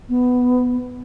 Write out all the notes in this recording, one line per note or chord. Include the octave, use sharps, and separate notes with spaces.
B3